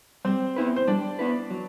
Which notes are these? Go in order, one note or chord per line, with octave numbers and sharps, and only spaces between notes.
G3 C4 C5
B3 E4 B4
C5
G3 D4 D5
B3 E4 B4
F#3